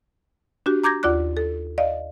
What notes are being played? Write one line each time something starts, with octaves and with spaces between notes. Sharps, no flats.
D4 F#4 G4
A#5 D6 G6 G#6 A#6
D#2 F4 D5 D6 F#6
A4
D5 D#5 F5